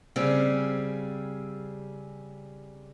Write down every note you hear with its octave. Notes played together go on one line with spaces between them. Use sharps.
C#3 G3 C4 G#4